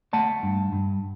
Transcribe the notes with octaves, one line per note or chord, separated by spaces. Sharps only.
A3 F#5 A5
G2
G2